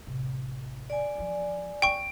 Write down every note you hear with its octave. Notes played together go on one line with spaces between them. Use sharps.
A1 C3
D5 G#5
E3 F3
D#2 C4 G5 C#6 D7